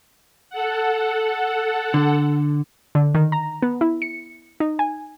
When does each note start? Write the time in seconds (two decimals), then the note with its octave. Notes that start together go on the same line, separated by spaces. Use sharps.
0.50 A4 F#5
1.94 D3
2.95 D3
3.15 D#3
3.32 A#5
3.62 B3
3.81 E4
4.02 C#7
4.60 D#4
4.79 G#5